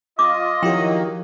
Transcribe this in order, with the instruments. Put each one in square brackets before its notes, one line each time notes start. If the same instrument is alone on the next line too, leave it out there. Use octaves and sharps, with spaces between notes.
[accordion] F4 [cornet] D#5 [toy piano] D6
[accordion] D#3 F#3 A#3 [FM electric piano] F3 E4 G4 [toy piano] G5